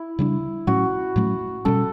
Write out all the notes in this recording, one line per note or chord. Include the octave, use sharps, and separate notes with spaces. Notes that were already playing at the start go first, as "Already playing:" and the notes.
Already playing: E4
C#3 G3 D4
A2 F#3 A3 C#4 F#4
A2 F#3 A3 C#4
B2 G3 C#4 A4